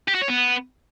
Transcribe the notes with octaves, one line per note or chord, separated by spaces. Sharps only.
G4
F#4
C#5
B3